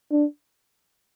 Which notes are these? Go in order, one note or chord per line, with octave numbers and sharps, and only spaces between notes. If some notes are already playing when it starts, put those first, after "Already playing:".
D4